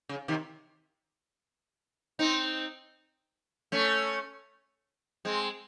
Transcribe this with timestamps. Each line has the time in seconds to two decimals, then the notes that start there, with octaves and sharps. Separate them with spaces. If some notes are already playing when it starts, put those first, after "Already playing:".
0.09 C#3
0.28 C3 D#3
2.19 C4 D#4
3.72 A3 C#4
5.25 G#3 C4